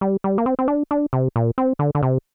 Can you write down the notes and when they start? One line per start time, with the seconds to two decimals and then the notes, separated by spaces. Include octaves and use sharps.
0.01 G3
0.24 G3
0.38 A#3
0.46 C4
0.59 C4
0.68 D4
0.91 D4
1.13 C3
1.36 A#2
1.58 C4
1.79 D3
1.95 D3
2.03 C3